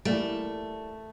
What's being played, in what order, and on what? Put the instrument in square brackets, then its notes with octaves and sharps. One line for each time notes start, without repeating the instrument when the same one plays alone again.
[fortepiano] E3 G3 A#3 [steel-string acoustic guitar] A3